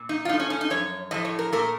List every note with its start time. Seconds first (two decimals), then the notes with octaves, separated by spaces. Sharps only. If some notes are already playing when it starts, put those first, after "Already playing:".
Already playing: A#2
0.09 D#4
0.25 F4
0.29 A2 D#4
0.34 A3
0.40 C#4
0.50 C#4
0.61 D#4
0.70 F#2 F3 C#5
1.11 A2 F3 A3 D#5
1.25 C#5
1.39 A#4
1.52 A#2 A3 A#4